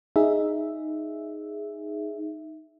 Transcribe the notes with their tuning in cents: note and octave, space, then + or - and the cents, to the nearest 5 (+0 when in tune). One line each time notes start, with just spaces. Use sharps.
D#4 +0 G#4 +0 E5 +0